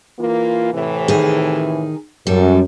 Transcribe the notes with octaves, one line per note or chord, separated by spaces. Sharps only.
E3 A#3 F4
A2 C3 E3
D#3 G#4
F#2 G3 A4